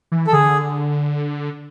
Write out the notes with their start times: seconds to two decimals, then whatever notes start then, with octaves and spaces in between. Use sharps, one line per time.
0.12 E3
0.27 A4
0.32 D3 G#4